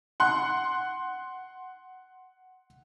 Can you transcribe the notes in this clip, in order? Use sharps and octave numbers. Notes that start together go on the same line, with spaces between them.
F#5 C6 F#6